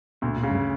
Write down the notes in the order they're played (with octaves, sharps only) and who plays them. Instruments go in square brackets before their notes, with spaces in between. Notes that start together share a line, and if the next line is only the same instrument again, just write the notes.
[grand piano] D2 [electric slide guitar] B2
[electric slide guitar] A#2
[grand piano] C#3
[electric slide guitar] G2